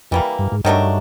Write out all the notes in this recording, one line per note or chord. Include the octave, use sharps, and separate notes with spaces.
F2 E3 G3 A#3
G2
G#2
G2 D#3 F#3 A3 D4